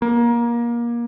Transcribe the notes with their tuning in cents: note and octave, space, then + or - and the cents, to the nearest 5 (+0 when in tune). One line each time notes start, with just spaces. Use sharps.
A#3 +25